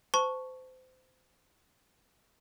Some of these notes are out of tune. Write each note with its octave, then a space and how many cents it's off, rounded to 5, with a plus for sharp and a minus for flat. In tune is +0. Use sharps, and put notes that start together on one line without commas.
C5 -30 A5 +0 C#6 +0